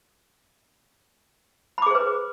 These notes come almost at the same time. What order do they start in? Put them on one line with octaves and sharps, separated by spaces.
B5 D6 G#4 C5 B4